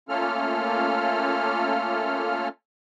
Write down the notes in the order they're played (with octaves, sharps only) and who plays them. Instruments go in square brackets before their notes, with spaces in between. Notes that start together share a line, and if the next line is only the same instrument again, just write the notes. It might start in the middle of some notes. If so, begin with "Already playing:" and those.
[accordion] A3 A#3 C#4 F4 A4 F6